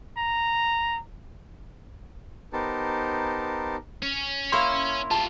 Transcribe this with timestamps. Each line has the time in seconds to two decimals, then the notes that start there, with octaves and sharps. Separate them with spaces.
0.17 A#5
2.53 B3 D#4 G4 A#4 C5 A5
4.03 C#4
4.52 A#3 E4 C#5 C6
5.11 F4 G4 A5